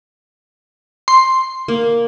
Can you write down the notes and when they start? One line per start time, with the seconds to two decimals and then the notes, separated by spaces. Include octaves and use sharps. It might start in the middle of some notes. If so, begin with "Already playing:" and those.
1.08 C6
1.68 A#3